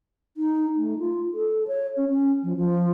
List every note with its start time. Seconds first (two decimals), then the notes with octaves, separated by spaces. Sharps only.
0.37 D#4
0.77 A3
0.99 F4
1.34 A4
1.68 C#5
1.97 C#4
2.09 C#4
2.43 F3
2.57 F3